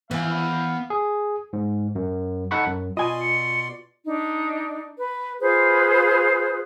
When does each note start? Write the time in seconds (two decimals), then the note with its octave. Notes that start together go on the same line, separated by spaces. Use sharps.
0.11 E3 B3 F5 G#5
0.90 G#4
1.53 G#2
1.95 F#2
2.51 D#4 A4 F#5 A5 B5 C#6
2.67 F#2
2.97 B2 F4 D5 D#5 G#5 C6
3.21 C#7
4.06 D4 D#4
4.97 B4
5.40 F4 G#4 B4 C5